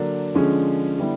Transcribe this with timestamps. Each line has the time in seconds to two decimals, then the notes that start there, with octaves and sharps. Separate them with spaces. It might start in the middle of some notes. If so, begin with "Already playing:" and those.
Already playing: D3 F#3 A#3 D4
0.35 D3 F3 G#3 C#4
0.98 D3 G3 B3 E4